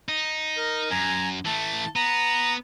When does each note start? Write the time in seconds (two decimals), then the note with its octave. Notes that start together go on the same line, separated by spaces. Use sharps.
0.09 D#4
0.57 A#4
0.90 F#2 G#5 A#5
1.45 E3 A3 A5
1.96 B3 A#5